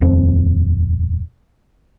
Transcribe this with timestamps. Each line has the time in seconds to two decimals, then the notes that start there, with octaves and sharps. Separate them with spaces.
0.01 D#1 F2 C4